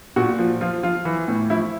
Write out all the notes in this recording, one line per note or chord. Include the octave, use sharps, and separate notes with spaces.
A#2 F#4
F3
F3 F4
F3 F4
E3
A2
F3 E4